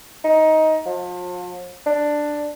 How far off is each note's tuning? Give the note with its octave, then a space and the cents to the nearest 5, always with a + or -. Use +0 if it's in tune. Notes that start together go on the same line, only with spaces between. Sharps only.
D#4 +15
F3 +40
D4 +10